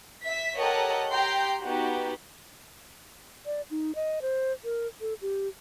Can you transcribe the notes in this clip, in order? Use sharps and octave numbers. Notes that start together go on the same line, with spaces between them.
E5 B6
G4 A4 A#4 C#5 D#5 F#5
G4 G5 A#5 C6 G6
B3 D#4 F#4 G4
D5
D#4
D#5
C5
A#4
A4
G4